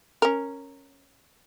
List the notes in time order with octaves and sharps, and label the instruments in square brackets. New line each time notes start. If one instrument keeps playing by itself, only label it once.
[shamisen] C#4 A#4